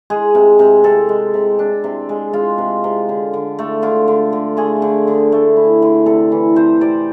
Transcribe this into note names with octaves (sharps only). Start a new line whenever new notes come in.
G#3 G#4
C3
C3
C3 A4
G#3
C3
D4
C3
G#3
G#3 F4
C3
C3
D3
D3
A3
D3 F4
D3
D3
A3 G#4
D3
D3
A3
E4
D3
C3 A4
E3
C3 C5
C3 D5